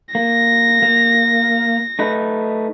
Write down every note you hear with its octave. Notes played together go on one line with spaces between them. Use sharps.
A#3 A#6
A#3
A3 D#4 B4